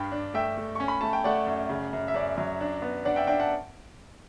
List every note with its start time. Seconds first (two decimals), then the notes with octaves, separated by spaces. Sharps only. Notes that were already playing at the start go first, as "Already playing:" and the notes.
Already playing: G2 G5 B5
0.12 D4
0.34 A3 E5 G5
0.57 A3
0.75 C#4 C#6
0.88 B5
1.01 A3 A5
1.13 G5
1.24 A3 D5 F#5
1.47 F#2
1.69 C#3
1.93 F#2
2.08 E5
2.14 F#2 D5
2.38 F#3
2.60 D4
2.82 B3
3.05 D4 D5 F#5
3.16 E5 G5
3.27 D4 E5 G5
3.40 F#5 A5